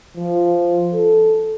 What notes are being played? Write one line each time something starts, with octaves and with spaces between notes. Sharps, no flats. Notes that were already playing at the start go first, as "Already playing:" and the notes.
F3
A4